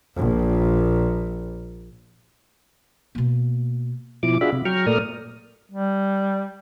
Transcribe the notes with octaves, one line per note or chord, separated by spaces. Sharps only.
A#1 A#2
B2 A#3
B2 F3 E4 D6
D4 F4 F#4 G#4 E5 B5
C3
F#3 G5 A#5 C#6 F6
A#2 A3 A#4 D5 D#6 F6
G3